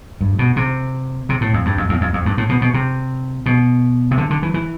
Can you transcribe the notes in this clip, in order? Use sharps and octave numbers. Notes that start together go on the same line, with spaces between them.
G2
B2
C3
C3
A2
F2
G2
F2
E2
F2
F2
G2
A2
B2
B2
C3
B2
C3
D3
D3
E3
E3